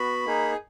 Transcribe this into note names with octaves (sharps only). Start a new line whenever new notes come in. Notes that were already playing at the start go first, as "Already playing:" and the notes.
Already playing: B3 F#4 B5
A#3 D#4 G#4